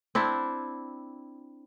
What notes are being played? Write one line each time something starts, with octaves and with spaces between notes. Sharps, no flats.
C4 D4 E4